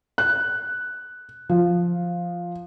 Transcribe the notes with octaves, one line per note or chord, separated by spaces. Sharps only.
F#6
F3